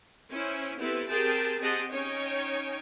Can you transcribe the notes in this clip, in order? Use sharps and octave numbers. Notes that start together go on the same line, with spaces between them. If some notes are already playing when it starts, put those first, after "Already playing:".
C#4 E4 C5
B3 C4 E4 G4 A4 B4
C4 G4 G#4 A#4 G5 A5
C4 G4 G#4 D#5 F#5 A5
C#4 D#4 C#5 G5 G#5